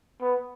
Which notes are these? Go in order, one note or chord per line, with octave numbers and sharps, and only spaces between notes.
B3